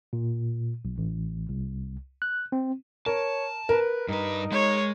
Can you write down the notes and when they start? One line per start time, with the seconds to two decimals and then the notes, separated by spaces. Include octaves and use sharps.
0.13 A#2
0.85 B1
0.98 A1
1.49 C2
2.22 F#6
2.52 C4
3.06 A#4 C#5 A5
3.69 A#4 B4
4.08 G2 D#4 B4
4.52 G#3 C#5